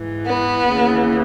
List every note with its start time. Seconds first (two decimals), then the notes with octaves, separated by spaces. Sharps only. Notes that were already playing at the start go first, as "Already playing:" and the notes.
Already playing: G#2 E3
0.25 B3
0.67 D#2 C#3 E3